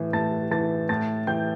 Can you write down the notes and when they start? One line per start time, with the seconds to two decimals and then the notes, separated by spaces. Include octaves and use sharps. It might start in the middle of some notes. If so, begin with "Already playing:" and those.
Already playing: A2 E3
0.13 A2 A5 A6
0.51 E3 A5 A6
0.89 A2 A5 A6
1.27 E3 G5 G6